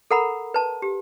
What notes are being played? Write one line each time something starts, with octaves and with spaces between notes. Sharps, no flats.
A4 A#4 F#5 A#5 B5
B4 A5
G4